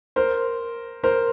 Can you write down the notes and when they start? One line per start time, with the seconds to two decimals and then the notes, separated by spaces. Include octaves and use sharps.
0.16 A#4 C5
1.03 A#4 C5